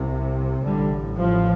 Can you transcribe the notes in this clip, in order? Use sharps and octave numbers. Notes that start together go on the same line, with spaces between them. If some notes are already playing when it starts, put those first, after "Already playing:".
Already playing: C2 C3
A1 A2 D3 G3
F3